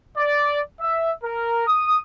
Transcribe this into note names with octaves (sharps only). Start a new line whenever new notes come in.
D5
E5
A#4
D#6